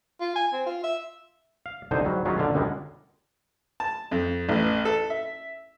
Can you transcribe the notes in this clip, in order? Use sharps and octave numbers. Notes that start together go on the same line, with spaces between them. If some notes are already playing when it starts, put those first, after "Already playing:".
F4
G#5
C4
F4
E5
F5
C2 D3 D#4 C5 G#5
G#2 F#3 G3
D#3 F#3 G#3 C#4 E4 F4
A#2 D3 F5
C#2 F#2 D3 G3 G#3
A5
F2
A1
A4
E5